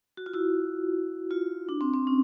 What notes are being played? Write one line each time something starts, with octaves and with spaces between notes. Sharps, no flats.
F#4
F4
E4 F#4
F4
D4
C4
C4
C#4